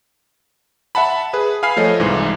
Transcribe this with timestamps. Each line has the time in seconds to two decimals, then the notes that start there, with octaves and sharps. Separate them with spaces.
0.95 E5 F#5 A5 B5
1.33 G#4 B4
1.63 F5 G#5 B5 F6 C7
1.77 F3 A3 C#5 D#5
2.00 C2 G#2 E3